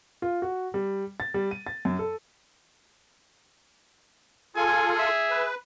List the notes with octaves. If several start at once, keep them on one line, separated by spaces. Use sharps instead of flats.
F4
F#4
G3
A6
G3
D#7
A6
F#2
A4
F4 G#4 A4 G#5
E5
B4